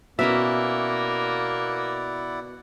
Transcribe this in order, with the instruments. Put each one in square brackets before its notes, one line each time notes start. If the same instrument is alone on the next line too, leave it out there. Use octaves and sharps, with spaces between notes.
[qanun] B2 C#4 A#4 [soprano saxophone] A#3 [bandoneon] E4 D5 F#5 [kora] E5